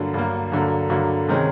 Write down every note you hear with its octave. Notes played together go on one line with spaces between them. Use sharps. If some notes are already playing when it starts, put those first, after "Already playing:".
Already playing: G2 D3 F#3 A#3
G2 D3 F#3 A#3
G2 D3 F#3 A#3
G2 D3 F#3 A#3
C3 D#3 G#3 C#4